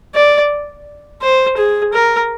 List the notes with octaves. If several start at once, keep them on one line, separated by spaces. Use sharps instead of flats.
D5
C5
G#4
A#4